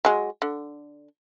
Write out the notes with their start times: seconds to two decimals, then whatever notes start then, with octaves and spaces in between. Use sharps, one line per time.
0.05 F#3 G#3
0.42 D3